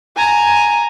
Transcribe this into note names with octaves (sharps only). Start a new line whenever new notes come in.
G#5 A#5